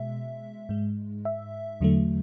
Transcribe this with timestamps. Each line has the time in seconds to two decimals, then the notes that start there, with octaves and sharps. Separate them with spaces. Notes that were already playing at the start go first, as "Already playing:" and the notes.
Already playing: B2 G#3 E5
0.69 G#2 G#3
1.25 E5
1.81 E2 D3 F#3 A3